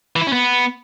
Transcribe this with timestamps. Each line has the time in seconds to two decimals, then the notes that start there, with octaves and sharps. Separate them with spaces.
0.16 E3
0.21 E4
0.27 C#4
0.33 B3